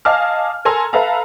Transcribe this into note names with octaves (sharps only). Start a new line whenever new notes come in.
D#5 F5 G#5 A5 D6 F6
A4 A#4 G#5 A#5 C6 E6
A4 B4 E5 F5 A5 A#5